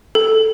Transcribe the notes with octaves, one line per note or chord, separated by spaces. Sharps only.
A4